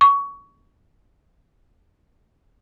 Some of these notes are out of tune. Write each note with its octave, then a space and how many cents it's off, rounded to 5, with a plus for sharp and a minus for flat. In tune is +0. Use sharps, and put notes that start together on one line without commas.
C#6 +20